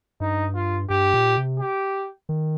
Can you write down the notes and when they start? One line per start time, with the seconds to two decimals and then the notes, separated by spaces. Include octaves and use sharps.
0.20 G2 D#4
0.55 F4
0.90 G2 G4
1.14 A#2
1.37 C3
1.60 G4
2.29 D#3